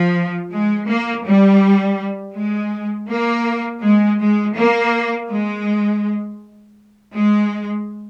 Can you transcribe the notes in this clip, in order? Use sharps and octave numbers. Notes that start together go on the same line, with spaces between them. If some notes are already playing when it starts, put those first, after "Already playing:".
Already playing: F3
G#3
A#3
G3
G#3
A#3
G#3
G#3
A#3
G#3
G#3